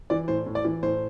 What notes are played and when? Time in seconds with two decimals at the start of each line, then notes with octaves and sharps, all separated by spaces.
0.10 E3 D5
0.28 A2 C5
0.46 A2
0.55 D5
0.65 E3
0.83 A2 C5